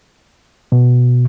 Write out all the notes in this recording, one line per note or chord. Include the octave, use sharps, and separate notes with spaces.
B2